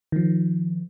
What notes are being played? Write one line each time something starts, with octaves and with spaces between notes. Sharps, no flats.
D#3 F3